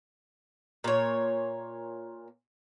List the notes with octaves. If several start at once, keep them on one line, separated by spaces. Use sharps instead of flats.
A#2 C#5